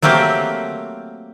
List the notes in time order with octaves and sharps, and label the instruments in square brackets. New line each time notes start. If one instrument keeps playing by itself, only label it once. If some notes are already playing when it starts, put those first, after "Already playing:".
[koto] F#3 A3 A#3 C4 G4